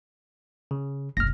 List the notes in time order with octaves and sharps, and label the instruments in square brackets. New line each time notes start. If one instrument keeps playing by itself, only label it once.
[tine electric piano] C#3
[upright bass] F#1 B1 [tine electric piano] F6 A#6